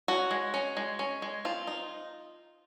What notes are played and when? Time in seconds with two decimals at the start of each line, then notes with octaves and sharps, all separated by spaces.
0.08 C#4 F#4
0.31 G#3
0.54 C#4
0.77 G#3
0.99 C#4
1.22 G#3
1.45 C4 F4
1.67 D#4